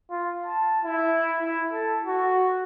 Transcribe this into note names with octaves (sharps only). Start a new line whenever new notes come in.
F4
A5
E4
E4
A4
F#4